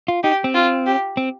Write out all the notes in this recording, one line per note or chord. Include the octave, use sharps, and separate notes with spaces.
F4
D#4 G4
C4
F4
G4
C4